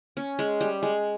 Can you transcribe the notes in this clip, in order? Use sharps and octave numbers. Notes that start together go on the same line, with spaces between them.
C#4
G#3
G3
G#3